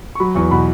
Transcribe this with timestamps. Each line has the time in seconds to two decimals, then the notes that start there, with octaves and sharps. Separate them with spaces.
0.15 C#6
0.20 F#3 B5
0.35 E2 C#6
0.51 B2 B5